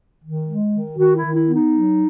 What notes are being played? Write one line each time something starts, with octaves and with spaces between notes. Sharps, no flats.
D#3
G#3
D#3
D#3 F#4
E4
D#3
E4
B3
D#4
F#3